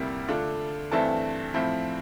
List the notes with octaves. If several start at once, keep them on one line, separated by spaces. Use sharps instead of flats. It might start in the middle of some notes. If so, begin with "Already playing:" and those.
Already playing: D2 C3 G3 A#3 E4
D3 A3 D4 F4
G2 E3 A3 C4 E4 A5
A2 F3 C4 E4